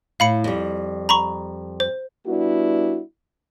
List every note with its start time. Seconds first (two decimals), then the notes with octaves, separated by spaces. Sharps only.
0.20 A2 F5 B5 C#7
0.44 F2 G3
1.09 A#5 B5 C#6
1.80 C5
2.27 G3 B3 D4 E4 F#4